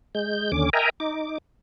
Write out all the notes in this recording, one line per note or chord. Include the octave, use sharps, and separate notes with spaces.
G#3 G6
D#2 D3 C#4 D6
A#4 D#5 E5 G5 G#5 A#5
D#4 D6